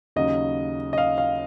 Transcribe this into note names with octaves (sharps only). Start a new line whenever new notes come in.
D#2 C#3 F#3 D#5
D#5
F5
F5